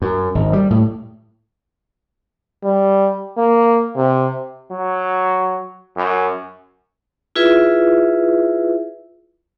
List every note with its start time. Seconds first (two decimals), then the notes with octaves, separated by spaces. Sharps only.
0.02 F#2
0.35 G#1
0.53 G3
0.70 A2
2.64 G3
3.38 A#3
3.97 C3
4.71 F#3
5.96 F#2
7.36 E4 F4 G#4 B4 E5